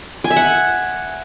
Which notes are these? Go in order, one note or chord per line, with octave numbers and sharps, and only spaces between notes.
G#5
E5
F#5